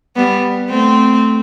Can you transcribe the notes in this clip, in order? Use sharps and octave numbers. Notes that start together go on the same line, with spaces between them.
G3 B3
A3 C4